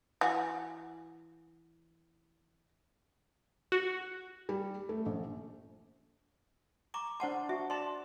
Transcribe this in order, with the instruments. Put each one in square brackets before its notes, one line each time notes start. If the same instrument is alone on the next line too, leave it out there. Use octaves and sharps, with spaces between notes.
[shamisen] E3 F#4
[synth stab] F#4
[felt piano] G3
A3
A#1
[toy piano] A#5 C#6 D6
[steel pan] D4 C6 [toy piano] C5 F#5 A5
[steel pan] F#4 [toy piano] E5
[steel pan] D5 A5 [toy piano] C6